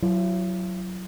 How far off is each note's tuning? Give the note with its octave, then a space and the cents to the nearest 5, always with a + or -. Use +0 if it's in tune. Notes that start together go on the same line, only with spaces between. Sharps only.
F#3 +0 E4 +40